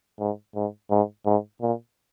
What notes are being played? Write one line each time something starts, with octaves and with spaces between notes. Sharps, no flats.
G#2
G#2
G#2
G#2
A#2